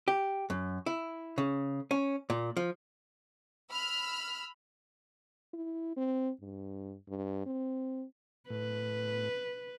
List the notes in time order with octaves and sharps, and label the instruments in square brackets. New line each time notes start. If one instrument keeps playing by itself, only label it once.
[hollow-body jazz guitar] G4
F#2
E4
C#3
C#4
A#2
F3
[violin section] B5 E6 F6
[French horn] E4
C4
G2
G2
C4
[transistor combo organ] A2 [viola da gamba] B4